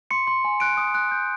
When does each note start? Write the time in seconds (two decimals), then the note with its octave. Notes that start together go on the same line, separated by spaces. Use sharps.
0.11 C6 C#7
0.27 C6
0.45 G#5
0.60 F#6 D7
0.77 D#6
0.94 F#6
1.11 G6